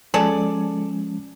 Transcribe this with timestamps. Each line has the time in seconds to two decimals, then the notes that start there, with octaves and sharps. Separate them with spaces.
0.14 F3 G#3 C#4 G#4 A4 D5